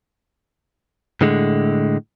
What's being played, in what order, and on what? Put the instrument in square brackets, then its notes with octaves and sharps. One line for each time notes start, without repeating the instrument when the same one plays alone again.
[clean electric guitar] A2 D3 G#3